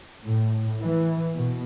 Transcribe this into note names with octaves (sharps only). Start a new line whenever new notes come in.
A2
E3
B2